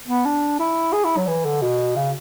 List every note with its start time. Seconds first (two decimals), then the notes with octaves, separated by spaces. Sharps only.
0.08 B3
0.25 D4
0.59 E4
0.93 G#4
1.04 E4
1.17 F#3
1.27 E3
1.45 D3
1.62 B2
1.96 C#3